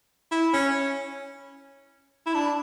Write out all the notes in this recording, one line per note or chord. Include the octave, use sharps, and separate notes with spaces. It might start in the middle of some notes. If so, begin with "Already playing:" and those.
E4
C#4
E4
D4